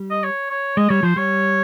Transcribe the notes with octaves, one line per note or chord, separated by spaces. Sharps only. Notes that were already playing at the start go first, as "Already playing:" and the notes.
Already playing: G3
D#5
C#5
C#5
G#3 D#5
G3 C#5
F3 C5
G3 C#5